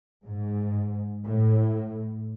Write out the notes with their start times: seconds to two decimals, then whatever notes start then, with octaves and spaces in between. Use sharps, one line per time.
0.25 G#2
1.25 A2